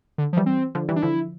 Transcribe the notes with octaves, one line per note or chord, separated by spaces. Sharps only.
D3
F3
E3 G3
C4
D3 F3
E3 G3
D4
D3 F3 E4